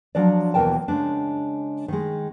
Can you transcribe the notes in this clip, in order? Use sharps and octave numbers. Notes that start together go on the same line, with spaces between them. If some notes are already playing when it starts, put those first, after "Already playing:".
F3 F#3 D4 D5
D#2 B2 E3 A#4 G5 A5
C#3 G#3 D4
D#3 G#3